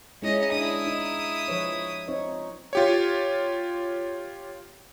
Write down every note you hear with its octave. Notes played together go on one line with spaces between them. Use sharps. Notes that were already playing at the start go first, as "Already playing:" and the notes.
G#3 C#4 D#4 E4 D#5
D4 E4 D#6
D#4 D#5
F3 B4 C#5
C4 D#4 C#5
F4 G4 C#5